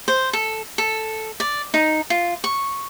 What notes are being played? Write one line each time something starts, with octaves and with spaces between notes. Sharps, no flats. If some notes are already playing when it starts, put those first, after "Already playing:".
C5
A4
A4
D5
D#4
F4
C#6